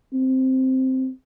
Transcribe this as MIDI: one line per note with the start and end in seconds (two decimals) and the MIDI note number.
0.13 1.09 60